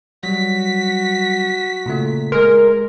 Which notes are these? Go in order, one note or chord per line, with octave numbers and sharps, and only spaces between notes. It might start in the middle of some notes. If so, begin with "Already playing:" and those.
F#3 G3 F#4 B6
A#2 C#3 A3
G#3 G#4 A#4 C6